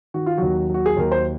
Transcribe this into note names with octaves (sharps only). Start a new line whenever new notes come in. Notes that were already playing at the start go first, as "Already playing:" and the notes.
D#3 F#4
F4
D#2 F#3 F#4
F#3 F#4
G#4
D#2 A#4
C5